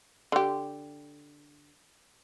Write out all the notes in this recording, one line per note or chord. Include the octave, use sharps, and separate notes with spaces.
D3 G4